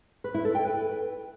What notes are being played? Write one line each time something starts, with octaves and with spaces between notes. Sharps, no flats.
B4
E4
A4
G5
B4